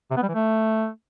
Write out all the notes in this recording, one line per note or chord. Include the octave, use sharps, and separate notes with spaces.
C3
B3
G3
E3
A3